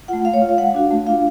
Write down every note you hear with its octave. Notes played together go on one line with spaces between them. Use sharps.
A3 F4 F#5
A3 F5
C#5
F4
F5
G#3 F#5
D4 F#4 F5
A3
D4 F4 F5